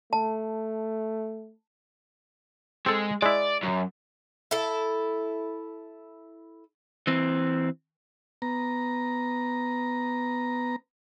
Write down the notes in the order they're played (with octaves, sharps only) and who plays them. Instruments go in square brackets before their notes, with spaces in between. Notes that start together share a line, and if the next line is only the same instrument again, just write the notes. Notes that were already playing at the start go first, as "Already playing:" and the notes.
[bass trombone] A3 [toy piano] A5
[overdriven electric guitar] G#3 [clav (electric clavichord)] C4 A4
[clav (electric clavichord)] G#3 E4 [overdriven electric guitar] D5
[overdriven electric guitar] F#2
[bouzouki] E4 A4
[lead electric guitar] E3 C4
[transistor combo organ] B3 A#5